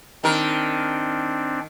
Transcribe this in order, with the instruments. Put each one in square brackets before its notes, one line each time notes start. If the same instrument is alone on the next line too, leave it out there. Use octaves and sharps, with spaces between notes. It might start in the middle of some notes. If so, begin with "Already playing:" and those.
[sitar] D#3 A#4 [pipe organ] C4 D4